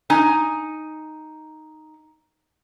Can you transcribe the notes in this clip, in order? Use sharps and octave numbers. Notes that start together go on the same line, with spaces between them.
D#4 G#5